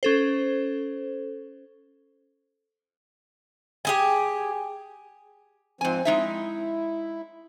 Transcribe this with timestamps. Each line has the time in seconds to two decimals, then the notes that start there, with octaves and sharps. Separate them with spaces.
0.03 C#4 A4 C5
3.85 G4 G#4 G#5
5.81 G#2 F3 C4 G#5
6.05 G#3 D#4 E4 E5